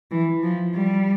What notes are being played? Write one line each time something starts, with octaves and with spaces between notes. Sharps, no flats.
E3
F3
G3